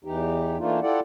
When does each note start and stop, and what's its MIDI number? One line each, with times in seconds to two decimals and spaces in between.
0.04 0.58 40
0.04 0.58 52
0.04 0.58 63
0.04 0.58 67
0.58 0.80 52
0.58 0.80 57
0.58 0.80 58
0.58 0.80 62
0.58 0.80 63
0.58 0.80 65
0.82 1.00 64
0.82 1.00 65
0.82 1.00 67
0.82 1.00 69
0.82 1.00 74
0.82 1.00 78